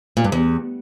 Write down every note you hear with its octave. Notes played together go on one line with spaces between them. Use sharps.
A#2
G2
E2